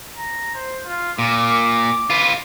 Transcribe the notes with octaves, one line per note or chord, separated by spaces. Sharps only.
A#5
C5
F4
A#2 D6
F4 B4